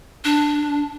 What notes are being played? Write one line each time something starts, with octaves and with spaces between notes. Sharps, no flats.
D4